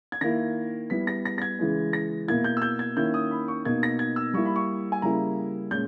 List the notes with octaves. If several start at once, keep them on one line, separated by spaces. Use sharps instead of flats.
G#6
D#3 A#3 E4 A#6
G3 B3 E4 B6
A#6
A#6
A#6
G#6
C#3 E3 G#3
A#6
B2 A#3 E4 G#6
G6
E6
G6
G#6
D#3 A#3 C#4 E4 G6
D#6
B5
C#6
B2 A#3 D#4 G#6
A#6
G#6
E6
G3 A#3 E4 C#6
B5
C#6
G#5
C#3 G3 A#3 E4 A#5
A#2 G#3 C#4 G6